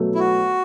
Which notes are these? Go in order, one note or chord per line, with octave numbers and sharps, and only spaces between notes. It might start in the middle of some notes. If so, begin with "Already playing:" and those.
Already playing: B2 F#3 A3
E4
F#4